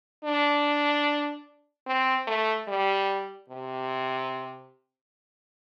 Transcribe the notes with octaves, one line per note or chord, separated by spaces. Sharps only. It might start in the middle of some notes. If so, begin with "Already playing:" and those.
D4
C4
A3
G3
C3